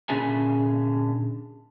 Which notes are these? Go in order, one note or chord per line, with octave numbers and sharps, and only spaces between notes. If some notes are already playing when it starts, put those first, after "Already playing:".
A#2 D3 C#4 G#4 E5 G#5